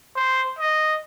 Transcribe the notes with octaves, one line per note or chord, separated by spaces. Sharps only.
C5
D#5